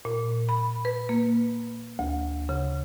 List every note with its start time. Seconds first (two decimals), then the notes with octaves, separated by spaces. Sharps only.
0.05 A#2
0.49 B5
0.85 B4
1.09 A#3
1.99 D2
2.49 C#3